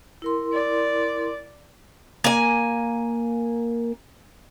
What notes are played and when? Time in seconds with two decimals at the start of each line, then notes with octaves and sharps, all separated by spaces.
0.22 E4 A#4 C6
0.53 D5
2.24 A#3 G#5